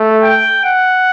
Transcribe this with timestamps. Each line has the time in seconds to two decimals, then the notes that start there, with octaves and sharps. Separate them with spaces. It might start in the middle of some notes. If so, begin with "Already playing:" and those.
Already playing: A3
0.23 G5
0.65 F#5